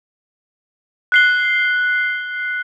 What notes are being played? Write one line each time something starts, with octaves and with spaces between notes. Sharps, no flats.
F#6 C7 G7